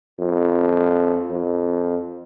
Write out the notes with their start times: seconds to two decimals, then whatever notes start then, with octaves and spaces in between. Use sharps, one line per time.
0.19 F2
1.30 F2